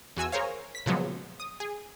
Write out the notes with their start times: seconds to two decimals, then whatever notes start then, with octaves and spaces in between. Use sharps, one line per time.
0.17 E2 F#4 G#5 E6
0.32 G#4 A#4 C5 C#5 F5
0.75 B6
0.86 A#2 C#3 F3 F#3 G#3 B3
1.40 D#6
1.60 G#4